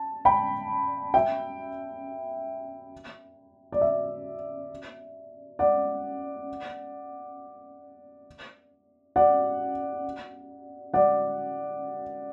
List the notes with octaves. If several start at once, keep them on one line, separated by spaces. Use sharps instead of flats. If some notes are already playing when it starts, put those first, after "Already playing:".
Already playing: A5
G5 B5
E5 G5
D5
E5
D5 F#5
D5 F#5
D5 F#5